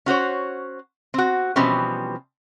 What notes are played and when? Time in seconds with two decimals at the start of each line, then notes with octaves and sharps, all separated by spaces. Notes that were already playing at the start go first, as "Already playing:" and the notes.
0.06 C#4 F#4 C5 C#5
1.14 C4 F#4
1.56 B2 E3 F3 G3 C4 C#4